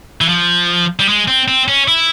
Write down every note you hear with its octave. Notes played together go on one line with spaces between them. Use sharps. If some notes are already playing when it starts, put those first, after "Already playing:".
E3
F3
G3
G#3
C4
C4
C#4
E4